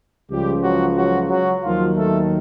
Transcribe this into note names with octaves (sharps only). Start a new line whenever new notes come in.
C#2 C#3 F3 G3 G4
F#3 F#4
F#3 F#4
F#3 F#4
D#2 D#3 F3 F#3 F4
A3 A4